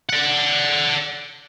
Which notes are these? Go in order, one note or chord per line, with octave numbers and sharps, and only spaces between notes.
D5 F#5